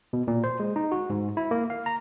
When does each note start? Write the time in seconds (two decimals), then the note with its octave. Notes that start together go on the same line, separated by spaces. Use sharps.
0.13 B2
0.28 A#2
0.44 C5
0.60 G#3
0.76 D#4
0.92 F#4
1.10 G#2
1.37 E4
1.51 A#3
1.70 F5
1.86 A#5